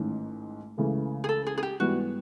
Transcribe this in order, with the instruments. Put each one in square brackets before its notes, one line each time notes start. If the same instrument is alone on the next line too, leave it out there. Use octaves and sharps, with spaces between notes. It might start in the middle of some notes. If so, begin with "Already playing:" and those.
Already playing: [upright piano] A1 G#2 D#3
C#2 C#3 E3 A3 C#4
[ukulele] G#4
A4
G#4
G#4
G4
[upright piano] G#2 E3 G3 B3 [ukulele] F#4